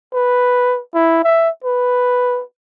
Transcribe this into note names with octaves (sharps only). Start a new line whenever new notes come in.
B4
E4
E5
B4